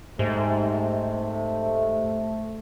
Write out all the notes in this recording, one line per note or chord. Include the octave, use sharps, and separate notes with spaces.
G#2 C3 A3